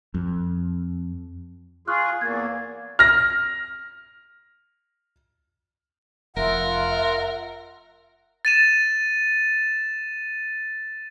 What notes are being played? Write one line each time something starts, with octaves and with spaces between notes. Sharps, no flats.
F2
F4 G#4 C#6 F6 F#6
E2 A#3 G#6 A6
F6 A#6
F1 F4 A#4 E5 F#5
A6 D#7 E7